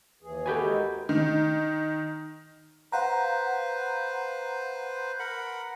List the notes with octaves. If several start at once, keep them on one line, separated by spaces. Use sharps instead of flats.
D#2 E3 G#4
F#4 G4 A4 G#5 B5 G6
G#3 D#4 A#4
D#3
B4 C5 F5 F#5 A#5
A#4 F#5 B5